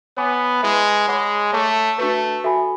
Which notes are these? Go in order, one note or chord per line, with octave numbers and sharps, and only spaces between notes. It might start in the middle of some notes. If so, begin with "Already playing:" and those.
B3 C#5 G#5 B5 D6
G#3 E4 G#4 B4 E5 B5
G#3 G#4 C#5 F#5 B5 D6
A3 C#5 E5 A5 D6
A3 D4 F#4 B4
F#4 A4 E5 G#5 B5